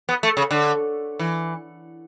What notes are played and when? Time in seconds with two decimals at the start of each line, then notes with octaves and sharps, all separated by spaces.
0.09 B3
0.23 A3
0.37 C#3
0.51 D3
1.19 E3